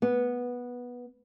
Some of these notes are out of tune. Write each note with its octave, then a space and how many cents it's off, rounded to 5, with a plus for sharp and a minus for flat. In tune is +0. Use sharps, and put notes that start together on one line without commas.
B3 -10